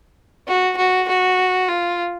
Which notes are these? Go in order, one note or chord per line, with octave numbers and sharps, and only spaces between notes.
F#4
F#4
F#4
F4